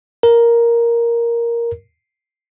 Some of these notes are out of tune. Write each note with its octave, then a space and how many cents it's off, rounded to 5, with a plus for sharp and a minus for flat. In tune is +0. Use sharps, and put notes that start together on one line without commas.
A#4 +5